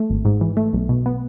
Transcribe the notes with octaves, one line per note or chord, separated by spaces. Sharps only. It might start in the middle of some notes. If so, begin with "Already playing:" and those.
Already playing: A3
G#1
G#2
E3
A3
B1
B2
B3